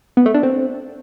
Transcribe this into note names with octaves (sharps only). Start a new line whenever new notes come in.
B3
A3
D4
C4